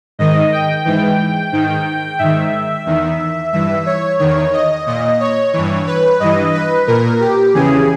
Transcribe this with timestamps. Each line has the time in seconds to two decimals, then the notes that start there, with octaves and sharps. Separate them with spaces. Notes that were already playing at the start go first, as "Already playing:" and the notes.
0.19 G#2 D#3 D#5
0.52 G5
0.85 G#2 E3
1.52 G#2 D#3
2.19 G#2 D#3 E5
2.86 E2 D#3
3.52 G2 E3 E5
3.86 C#5
4.19 E2 D#3 C#5
4.53 D#5
4.86 A#2 D#5
5.20 C#5
5.53 G2 E3 C#5
5.87 B4
6.20 G2 E3 D#5
6.53 B4
6.87 A#2 A#4
7.20 G4
7.54 E2 C#3 E3 G#4